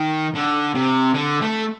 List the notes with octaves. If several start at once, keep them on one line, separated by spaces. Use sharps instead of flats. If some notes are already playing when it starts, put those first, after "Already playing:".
Already playing: D#3
D3
C3
D3
A3